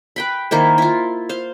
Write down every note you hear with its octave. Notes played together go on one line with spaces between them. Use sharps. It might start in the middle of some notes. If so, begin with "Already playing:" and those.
B4 G5 B5
D#3 A#3 E4 C5
E4 F4
C5 F5